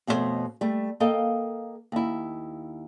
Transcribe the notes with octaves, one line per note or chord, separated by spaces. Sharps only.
F2 B2 A3 D#4 C5 C#5
G3 A3
A#3 A4 D#5 F5 G5
D#2 E4